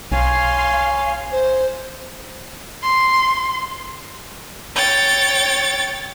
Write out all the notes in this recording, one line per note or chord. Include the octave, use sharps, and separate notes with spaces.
B1 C#5 F5 G#5 C6
C5
C6
C#5 G5 A6